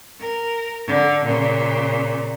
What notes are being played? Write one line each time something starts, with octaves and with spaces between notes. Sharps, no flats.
A#4
D3
A#2 C#3